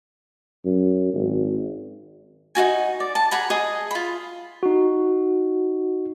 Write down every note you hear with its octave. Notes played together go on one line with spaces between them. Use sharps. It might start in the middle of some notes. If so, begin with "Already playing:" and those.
F#2
G#1
D#4 F4 F#4 G#5
D5
A5
G#4 F#5 A#5 B5
G#4 D#5
F4 B5
D#4 F#4